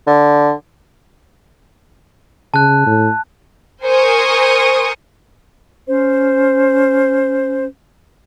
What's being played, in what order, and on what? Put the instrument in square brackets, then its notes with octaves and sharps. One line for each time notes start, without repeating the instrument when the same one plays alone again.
[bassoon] D3
[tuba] C#3 [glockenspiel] A5 F#6
[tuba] A2
[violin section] A#4 C5 G#5 C#6 D#6
[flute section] C#4 C5